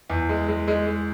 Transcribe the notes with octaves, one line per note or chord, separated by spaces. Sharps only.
E2
G#3
G#3
G#3
G#3